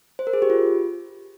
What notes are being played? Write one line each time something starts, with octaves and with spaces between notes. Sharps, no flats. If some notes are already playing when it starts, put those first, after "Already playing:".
C5
A#4
G#4
G4
F4